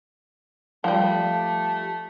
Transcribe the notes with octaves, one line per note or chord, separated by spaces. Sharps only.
F3 G3 A3